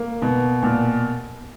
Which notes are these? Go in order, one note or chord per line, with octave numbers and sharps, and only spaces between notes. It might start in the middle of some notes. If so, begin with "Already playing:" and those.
Already playing: A#3
B2
A#2